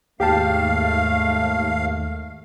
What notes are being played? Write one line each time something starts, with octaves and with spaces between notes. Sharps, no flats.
D#2 G#2 A3 G4 F5 G5 A5